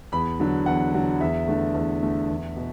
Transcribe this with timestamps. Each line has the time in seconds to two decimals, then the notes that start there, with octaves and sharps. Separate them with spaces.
0.12 E2 B5
0.40 D3 F#3
0.66 E2 F#5
0.94 D3 F#3
1.21 E2 E5
1.47 D3 A3
1.75 E2
2.03 D3 A3
2.29 E2
2.56 B2